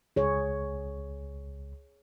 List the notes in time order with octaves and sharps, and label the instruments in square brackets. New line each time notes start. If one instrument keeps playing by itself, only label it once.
[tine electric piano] C#2 [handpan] G#4 C#5